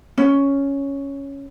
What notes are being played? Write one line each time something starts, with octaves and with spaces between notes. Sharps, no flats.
C#4